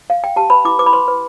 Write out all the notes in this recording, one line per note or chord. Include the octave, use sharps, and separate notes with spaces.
F5
G5
G4 A5
B4 B5
E4 D6
B4 D6
B5
B4 C6
B4